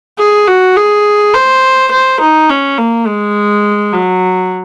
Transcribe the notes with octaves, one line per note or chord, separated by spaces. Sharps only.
G#4
F#4
G#4
C5
C5
D#4
C#4
A#3
G#3
F#3